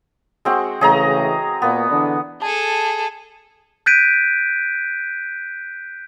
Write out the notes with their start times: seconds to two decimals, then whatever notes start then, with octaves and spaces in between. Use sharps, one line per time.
0.45 G#3 C4 F#4
0.81 C#3 E3 A3 G#4 D#5 A#5
1.62 A#2 A#3 B3
1.91 D3 E3 D4
2.42 G#4 A4 A5
3.86 F#6 G6 A6 B6 D7 D#7